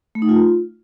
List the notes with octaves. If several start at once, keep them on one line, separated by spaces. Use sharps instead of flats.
A3
D#4
F4